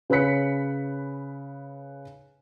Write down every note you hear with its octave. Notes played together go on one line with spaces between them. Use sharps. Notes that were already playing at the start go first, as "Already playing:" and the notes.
C#3 B4 C#5 F#6 B6 C#7